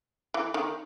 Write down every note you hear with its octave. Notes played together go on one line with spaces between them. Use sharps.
E3
D#3